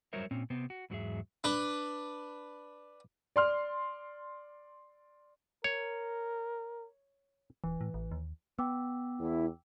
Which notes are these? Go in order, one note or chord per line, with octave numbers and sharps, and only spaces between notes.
F#3 G3 A#4 C5 C#5 E5
A#2 C4 C#4
C3 B3 C4
F#4
E2 G#2 F#3 G3 G#4 E5
D4 B4
D5 C6 F6
A#4 C#5
D#1 E3
A2
A1
D#2
B3 G5 D6 E6
E2 E4